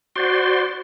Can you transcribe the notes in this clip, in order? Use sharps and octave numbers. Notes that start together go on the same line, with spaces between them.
F#4 C5 D5 C6